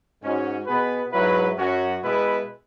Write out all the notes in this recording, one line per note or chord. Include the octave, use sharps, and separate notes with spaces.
G#2 G#3 C#4 F#4
B2 B3 G#4 B4
G#2 F#3 E4 B4
F#2 F#3 C#4 F#4
B2 G#3 B3 E4 B4